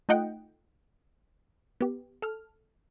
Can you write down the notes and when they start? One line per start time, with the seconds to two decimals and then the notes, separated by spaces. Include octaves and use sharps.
0.09 A3 D#4 F4 D#5 F#5 G5
1.81 B3 G4
2.22 A4 F6